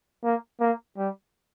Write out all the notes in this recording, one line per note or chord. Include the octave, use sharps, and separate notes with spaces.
A#3
A#3
G3